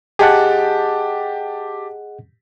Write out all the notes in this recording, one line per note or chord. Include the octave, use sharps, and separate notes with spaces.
G4 G#4 D#5 F#5 G5 A5